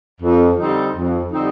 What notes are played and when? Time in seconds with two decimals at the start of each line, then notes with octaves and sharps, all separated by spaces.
0.21 F2
0.58 D3 G3 C4 D#4
0.94 F2
1.31 D3 G3 C4 D#4